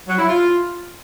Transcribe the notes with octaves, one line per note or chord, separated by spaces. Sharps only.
F#3
E4
F4